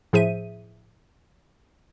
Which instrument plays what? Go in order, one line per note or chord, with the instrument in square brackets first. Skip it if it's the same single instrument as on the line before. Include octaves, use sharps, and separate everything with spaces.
[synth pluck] A2 F3 G#4 C5 E5 D#7